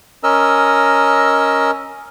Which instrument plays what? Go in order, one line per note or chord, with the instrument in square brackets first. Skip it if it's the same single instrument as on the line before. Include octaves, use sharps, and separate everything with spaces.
[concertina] C#4 A#4 D#5 E6